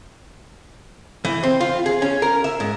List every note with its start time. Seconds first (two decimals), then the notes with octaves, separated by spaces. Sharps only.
1.25 E3
1.43 C4
1.61 F4
1.86 G#4
2.02 C#4
2.22 A#4
2.44 E5
2.60 G#2